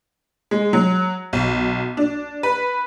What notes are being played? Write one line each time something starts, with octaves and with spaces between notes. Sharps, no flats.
G#3
F#3
B1
D4
B4